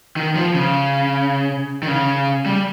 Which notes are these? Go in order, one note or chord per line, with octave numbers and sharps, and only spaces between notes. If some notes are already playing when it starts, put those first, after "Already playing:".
D#3
F3
C#3
D#3
C#3
G3